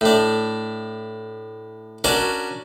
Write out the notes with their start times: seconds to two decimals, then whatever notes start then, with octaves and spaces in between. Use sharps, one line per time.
0.01 A2 D4
2.04 C#4 D4 F#4 A#4